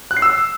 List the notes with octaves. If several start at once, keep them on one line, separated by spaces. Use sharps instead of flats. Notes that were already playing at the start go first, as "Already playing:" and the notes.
F#6
C7
E6